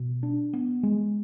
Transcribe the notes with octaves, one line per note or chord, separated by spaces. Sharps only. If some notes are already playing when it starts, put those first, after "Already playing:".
Already playing: B2
D4
B3
G#3